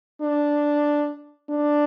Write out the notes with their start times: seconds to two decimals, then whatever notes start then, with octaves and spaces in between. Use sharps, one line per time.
0.22 D4
1.50 D4